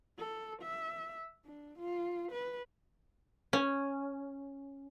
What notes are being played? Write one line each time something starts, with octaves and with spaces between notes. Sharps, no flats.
A4
E5
D4
F4
B4
C#4